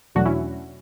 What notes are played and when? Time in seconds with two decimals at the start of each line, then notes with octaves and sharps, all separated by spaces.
0.15 E2 B2 F#3 A3 D4 F#4
0.25 C#4 E4